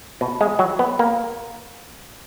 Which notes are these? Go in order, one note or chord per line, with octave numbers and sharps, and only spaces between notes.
B2
G#3
F#3
B3
A#3